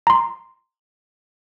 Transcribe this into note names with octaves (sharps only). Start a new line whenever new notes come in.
A#5 C6